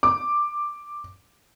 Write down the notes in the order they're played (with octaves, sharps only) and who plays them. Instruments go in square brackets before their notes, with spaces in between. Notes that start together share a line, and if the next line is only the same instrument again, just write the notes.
[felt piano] D6